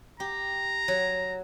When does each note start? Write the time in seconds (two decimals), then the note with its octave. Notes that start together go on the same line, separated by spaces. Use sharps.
0.20 G4 A#5
0.88 F#3